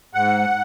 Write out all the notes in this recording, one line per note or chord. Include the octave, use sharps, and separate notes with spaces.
G#2 F#5